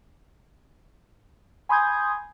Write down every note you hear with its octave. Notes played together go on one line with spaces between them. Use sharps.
G#5 B5 C6 D#6 G6 G#6